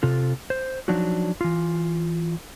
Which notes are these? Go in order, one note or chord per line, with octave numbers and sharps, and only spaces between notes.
C3 F4 A4
C5
F3 F#3 D4 D#4 F#4
E3 F4